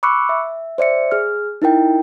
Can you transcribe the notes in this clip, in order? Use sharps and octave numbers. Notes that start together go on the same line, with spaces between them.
B5 C#6 D6 E6 F#6 C#7
E5
C5 D5 E5 C#7
G#4 F6
D#4 E4 A#4 G5